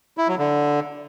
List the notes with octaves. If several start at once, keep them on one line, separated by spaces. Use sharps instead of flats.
E4
F#3
D3